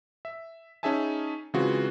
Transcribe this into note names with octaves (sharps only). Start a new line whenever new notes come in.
E5
C#4 D#4 G#4 E5 G#5 A5
C#3 E3 G#3 C4 F4 F#4